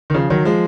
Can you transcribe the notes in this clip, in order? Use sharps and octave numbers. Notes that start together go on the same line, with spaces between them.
D#3
C#3 F3
D#3 F#3
F3 G#3